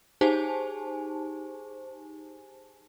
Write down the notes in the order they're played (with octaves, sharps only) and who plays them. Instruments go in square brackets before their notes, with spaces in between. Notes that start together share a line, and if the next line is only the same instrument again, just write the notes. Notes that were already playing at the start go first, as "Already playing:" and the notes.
[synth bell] D#4 G4 G#4 C5 G#5 A5